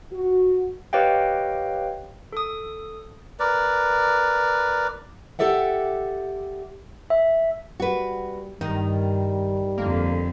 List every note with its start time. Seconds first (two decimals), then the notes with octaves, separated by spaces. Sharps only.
0.12 F#4
0.93 G4 B4 C#5 D#5 F5 G5
2.33 A4 D#6
3.40 A#4 B4 D5
5.39 G4 A4 D5 E5 F#5
7.10 E5
7.80 G3 F#4 B4
8.61 G2 D#3 G3 D#4
9.78 F2 D3 A#3